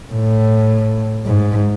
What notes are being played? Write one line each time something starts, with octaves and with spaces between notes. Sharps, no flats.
A2
G#2